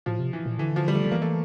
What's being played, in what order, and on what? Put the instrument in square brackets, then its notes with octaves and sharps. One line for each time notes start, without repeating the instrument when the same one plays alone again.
[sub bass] A2 [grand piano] F3
[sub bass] C3
[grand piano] E3
[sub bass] A#2
[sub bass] D3 [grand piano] E3
[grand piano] F3
G3
A3
[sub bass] D3
[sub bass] E3 [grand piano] A#3
[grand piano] A3